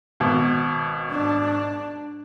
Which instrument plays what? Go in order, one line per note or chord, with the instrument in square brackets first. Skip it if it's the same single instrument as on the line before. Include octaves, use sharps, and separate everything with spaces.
[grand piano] G#1 B2
[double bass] G#2 D4